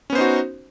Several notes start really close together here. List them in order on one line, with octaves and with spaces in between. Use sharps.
C#4 B3 C5 D#4 F#4